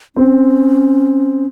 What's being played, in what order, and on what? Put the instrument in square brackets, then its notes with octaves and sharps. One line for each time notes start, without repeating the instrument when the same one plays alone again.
[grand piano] C4 [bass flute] C#4